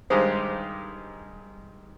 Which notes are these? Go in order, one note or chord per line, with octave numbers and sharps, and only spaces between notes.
G2 D#3 G#3 D#4 G4 C5